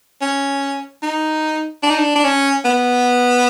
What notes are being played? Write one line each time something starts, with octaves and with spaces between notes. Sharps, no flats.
C#4
D#4
D4
D#4
D4
D4
C#4
B3